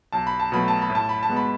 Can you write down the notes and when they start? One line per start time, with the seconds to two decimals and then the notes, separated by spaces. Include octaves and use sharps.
0.12 B1 A5
0.27 B5
0.40 A5
0.52 B2 F#3 A3 B5
0.68 A5
0.82 B5
0.90 A2
0.95 A5
1.09 B5
1.23 A5
1.29 G#3 B3
1.37 B5